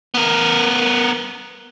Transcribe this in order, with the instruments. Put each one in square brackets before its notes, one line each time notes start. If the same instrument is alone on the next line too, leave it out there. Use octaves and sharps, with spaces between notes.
[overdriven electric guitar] B3 A#4